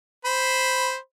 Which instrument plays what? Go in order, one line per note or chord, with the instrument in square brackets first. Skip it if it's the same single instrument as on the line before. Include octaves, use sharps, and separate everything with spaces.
[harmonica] C5 B5